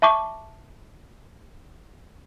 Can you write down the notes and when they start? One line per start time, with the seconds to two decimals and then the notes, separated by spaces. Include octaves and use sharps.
0.02 E5 A5 C#6 D6